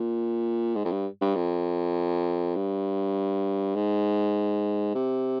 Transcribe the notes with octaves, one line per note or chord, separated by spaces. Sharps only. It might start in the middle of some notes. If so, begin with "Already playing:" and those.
Already playing: A#2
G#2
F2
G2
G2
F2
G2
G#2
C3